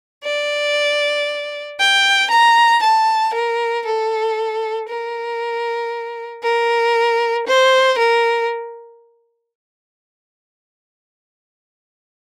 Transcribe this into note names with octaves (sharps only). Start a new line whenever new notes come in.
D5
G5
A#5
A5
A#4
A4
A#4
A#4
C5
A#4